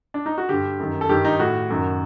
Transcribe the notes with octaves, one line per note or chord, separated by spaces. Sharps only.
D4
D#4
F#4
G2 D3 G4
F#2 D#3
A4
G2 D#3 G4
D#4
A2 F#4
F#2 D#3